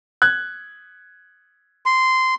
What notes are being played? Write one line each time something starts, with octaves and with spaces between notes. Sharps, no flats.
F#6 G#6
C6